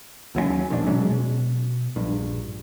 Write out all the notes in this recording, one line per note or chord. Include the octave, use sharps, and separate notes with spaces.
D#2 F#3 G#3 C#4
E1 A#1 F#2 D4
B2 F#3 G#3 C#4
B2
A#1 G2